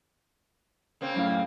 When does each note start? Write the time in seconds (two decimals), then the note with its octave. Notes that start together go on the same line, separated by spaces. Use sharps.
1.01 C#3 A#3 C4
1.16 F#2 A2 F5